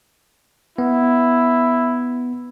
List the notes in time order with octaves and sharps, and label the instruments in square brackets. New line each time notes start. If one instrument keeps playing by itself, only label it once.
[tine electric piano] B3 [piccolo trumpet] E4